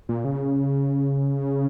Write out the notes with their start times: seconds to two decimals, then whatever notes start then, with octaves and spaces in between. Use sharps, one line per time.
0.09 A#2
0.25 C#3